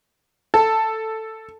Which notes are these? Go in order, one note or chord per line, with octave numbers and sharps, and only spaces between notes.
A4